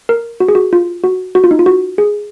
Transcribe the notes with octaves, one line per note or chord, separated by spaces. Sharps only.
A#4
F#4
G#4
F#4
F4
F#4
F#4
F4
D#4
F4
F#4
G#4